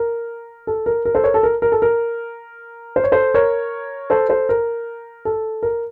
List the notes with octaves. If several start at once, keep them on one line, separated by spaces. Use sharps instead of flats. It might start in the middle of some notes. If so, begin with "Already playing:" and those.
Already playing: A#4
A4
A#4
A#4
A4 C5
A#4 C#5
A4
A#4
A#4
A4
A#4
C5
C#5
A4 C5
A#4 C#5
A4 C5
A4 C5
A#4
A4
A#4